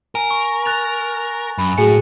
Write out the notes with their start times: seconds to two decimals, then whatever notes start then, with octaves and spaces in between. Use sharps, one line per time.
0.15 A#4 G#5
0.31 C#6
0.65 F#6 A6 F7
1.58 F#2 B5
1.78 A2 F#4 G#4 G#5 C#7